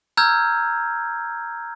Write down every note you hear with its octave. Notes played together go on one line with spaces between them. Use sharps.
A#5 E6 F6 G6 G#6